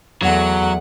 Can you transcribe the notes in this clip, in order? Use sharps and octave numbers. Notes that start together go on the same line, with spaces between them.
E2 F#3 A3 F#5